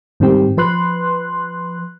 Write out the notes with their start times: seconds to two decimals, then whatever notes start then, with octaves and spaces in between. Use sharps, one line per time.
0.20 G#2 D#3 G3 C4 G4
0.57 F3 B4 C6 F#6